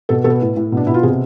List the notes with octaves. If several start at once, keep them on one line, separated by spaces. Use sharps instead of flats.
B2 A4
B2 A4
B4
A2
A2
B2
D4
B2 E4
F4
C3 G#4